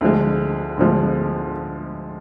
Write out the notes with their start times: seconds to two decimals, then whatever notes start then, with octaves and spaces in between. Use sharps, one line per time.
0.01 D2 D3 F3 G#3
0.77 D2 D3 F3 G#3